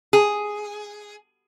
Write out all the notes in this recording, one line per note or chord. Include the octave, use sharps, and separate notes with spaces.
G#4